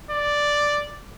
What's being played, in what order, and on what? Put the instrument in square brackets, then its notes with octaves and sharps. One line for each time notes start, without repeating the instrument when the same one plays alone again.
[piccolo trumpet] D5